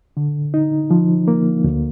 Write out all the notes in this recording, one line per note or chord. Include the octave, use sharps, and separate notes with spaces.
D3
D#4
F3
A#3
D2